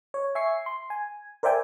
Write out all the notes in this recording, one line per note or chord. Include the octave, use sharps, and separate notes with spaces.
C#5
E5 G#5 C#6 C7
C6
G#5
A#4 C5 D5 E5 G5 G#5